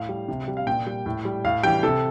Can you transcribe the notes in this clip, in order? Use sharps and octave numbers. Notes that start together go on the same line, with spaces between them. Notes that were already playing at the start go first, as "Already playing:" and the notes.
Already playing: A2 F5
G3
C3
G3
F5
A#2 G5
G3
A2
G3
A2 F5
E3 G3 G5
C3 A4